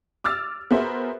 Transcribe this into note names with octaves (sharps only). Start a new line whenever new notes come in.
D6 E6 F6 A6
B3 F#4 G#4 A#4 C5 E5